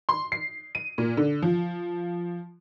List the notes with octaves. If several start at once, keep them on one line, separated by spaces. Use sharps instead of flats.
C6
C7
D#7
A#2
D3
F3